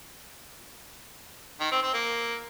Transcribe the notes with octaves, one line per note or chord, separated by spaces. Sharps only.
D#3
C4
C4
A#3